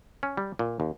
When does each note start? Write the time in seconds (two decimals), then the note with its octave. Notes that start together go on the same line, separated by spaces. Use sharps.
0.23 C#4
0.37 G3
0.59 A#2
0.80 D#2